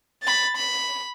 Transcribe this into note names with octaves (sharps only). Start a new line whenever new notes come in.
B5 A6
B5